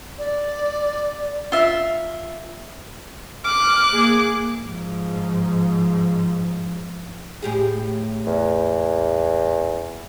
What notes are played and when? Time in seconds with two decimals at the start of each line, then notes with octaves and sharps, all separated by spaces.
0.18 D5
1.52 F4 E5
3.44 D6 F6 F#6
3.92 A#3 G#4
4.63 G#2 F3
7.42 A2 G4 G#4
8.27 E2